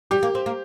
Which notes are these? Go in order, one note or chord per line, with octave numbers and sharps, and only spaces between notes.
G3 G4
A#3
C4
A#3